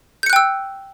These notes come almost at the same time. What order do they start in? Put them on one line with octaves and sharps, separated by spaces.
G6 C#7 F#6 G5 E6